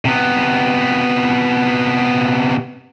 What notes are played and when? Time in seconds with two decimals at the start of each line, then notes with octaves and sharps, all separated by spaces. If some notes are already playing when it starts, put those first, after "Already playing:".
0.05 C3 B3